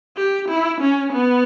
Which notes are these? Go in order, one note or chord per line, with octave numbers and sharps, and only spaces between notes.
G4
E4
C#4
B3